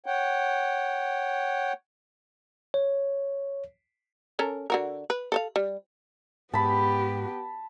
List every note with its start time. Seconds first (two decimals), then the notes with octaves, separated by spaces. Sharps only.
0.06 C#5 F#5 G5
2.74 C#5
4.39 C#4 A4 A#4
4.70 D3 F#4 A#4
5.10 B4
5.32 A4 C5 F5
5.56 G3
6.54 G#2 B3 G4 A5 B5